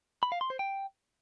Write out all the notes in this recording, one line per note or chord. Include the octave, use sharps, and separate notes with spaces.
B5
F5
C6
C5
G5